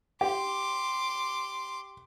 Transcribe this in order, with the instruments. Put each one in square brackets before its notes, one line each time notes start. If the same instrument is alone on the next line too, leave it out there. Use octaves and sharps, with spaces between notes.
[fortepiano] G4 [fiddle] C6 D6